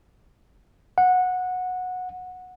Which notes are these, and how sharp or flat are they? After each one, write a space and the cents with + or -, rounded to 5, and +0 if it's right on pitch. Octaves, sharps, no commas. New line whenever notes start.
F#5 -15